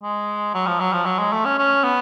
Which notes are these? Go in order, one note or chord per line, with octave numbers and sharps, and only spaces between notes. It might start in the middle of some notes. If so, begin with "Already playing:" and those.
G#3
F#3
F3
F#3
F3
F#3
G#3
A3
C#4
C#4
B3